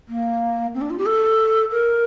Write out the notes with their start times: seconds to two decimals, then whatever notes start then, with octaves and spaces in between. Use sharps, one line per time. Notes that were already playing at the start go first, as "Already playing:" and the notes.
0.09 A#3
0.74 C4
0.81 D4
0.90 F4
0.98 G4
1.06 A4
1.72 A#4